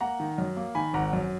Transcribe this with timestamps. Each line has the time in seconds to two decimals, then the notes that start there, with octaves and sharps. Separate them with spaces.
0.01 A#3 F#5 A#5
0.20 D#3
0.38 F#2
0.57 A#3
0.75 D#3 G#5 B5
0.94 G#1 F#5 A#5
1.13 F#2